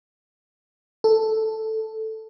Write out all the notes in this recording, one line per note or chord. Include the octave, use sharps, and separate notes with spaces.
A4